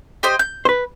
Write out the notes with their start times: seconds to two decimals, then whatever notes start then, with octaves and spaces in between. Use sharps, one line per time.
0.23 G4 C5 D#5
0.39 G6
0.65 B4 C5